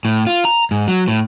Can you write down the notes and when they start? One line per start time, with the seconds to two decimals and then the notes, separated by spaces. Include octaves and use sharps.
0.05 A2
0.27 F4
0.45 A#5
0.71 G#2
0.88 F#3
1.08 A2